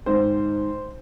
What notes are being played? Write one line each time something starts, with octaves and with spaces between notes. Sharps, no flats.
G#2 D#3 C5